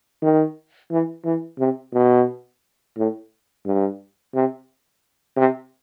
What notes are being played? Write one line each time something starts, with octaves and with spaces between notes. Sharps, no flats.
D#3
E3
E3
C3
B2
A2
G2
C3
C3